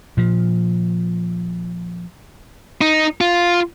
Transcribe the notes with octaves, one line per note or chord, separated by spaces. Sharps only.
A#2 F3
D#4
F4